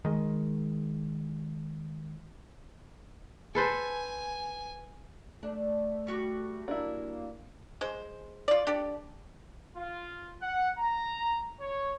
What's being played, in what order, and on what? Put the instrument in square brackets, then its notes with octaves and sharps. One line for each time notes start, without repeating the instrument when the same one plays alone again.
[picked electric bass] D#3 G#3
[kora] A4 B4 C5 [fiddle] G#5
[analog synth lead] A3 [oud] D4
[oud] G3 F#4 G4
[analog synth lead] A#3 [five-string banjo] D4 E4
[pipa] G#3 C5
F4 D5
D4 G4 A4
[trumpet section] F4
F#5
A#5
C#5